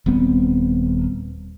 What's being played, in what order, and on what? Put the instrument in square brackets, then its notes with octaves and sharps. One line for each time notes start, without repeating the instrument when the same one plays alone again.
[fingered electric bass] D#1 G3 B3 C4